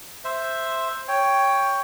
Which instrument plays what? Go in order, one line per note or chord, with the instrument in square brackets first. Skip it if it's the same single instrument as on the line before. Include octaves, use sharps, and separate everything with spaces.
[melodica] C5 E5
C#5 G5